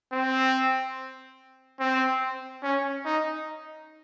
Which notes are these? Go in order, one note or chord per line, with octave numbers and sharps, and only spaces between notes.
C4
C4
C#4
D#4